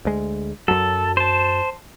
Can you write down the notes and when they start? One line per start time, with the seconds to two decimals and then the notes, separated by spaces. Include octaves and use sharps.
0.05 D2 G#3
0.68 F#2 F#3 A4
1.17 C5 A5